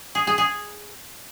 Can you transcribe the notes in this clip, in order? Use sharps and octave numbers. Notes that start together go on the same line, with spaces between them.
G#4
G#4
G#4